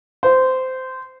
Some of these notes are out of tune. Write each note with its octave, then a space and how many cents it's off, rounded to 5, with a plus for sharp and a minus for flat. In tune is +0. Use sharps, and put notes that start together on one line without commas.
C5 -15